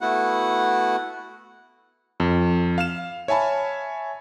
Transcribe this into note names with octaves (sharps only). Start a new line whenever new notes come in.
A3 B3 E4 F#4 F#5
F2
F5 F6 E7
C#5 E5 G#5 A5 B5